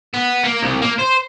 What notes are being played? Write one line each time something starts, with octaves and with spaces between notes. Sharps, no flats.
B3
A#3
C2
A#3
C5